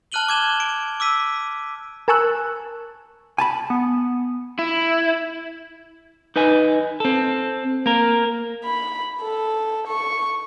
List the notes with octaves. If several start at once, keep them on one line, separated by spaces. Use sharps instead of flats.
A5 F6 F#6 D#7 F#7 G7
D6 G#6 E7 G7
D7
D6 E6 B6 D#7
A#4 G#5 A5 C#6 E6 F#6
G#5 A5 B5
B3
E4
D#4 B4 D#5 G#5
C4 A4
A#3 A#4
B5
A4
C#6